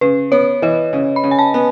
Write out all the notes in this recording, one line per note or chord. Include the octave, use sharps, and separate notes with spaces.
C#3 B4
B3 C#5
E3 D#5
C#3
B5
C#3
G#5
A5
B3